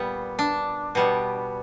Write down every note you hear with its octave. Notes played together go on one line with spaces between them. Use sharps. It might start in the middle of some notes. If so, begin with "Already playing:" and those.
Already playing: A#2 G3 B3
D4
B2 G3 B3